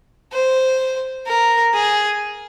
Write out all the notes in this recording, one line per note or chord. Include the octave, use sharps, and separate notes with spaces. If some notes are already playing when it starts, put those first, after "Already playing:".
C5
A#4
G#4